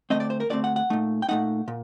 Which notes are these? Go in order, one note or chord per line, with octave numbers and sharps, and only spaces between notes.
D2 D3 A3 C4 D#5
D5
C5
A#4
D2 D3 A3 C4 D5
F#5
F#5
A#2 A3 D#4
G5
A#2 A3 D#4 F#5
A#2